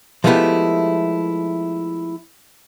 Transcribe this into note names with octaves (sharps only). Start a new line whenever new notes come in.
F3 G#3 A3 B3 E4 G4